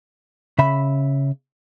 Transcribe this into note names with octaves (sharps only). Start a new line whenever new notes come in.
C#3 E5 B5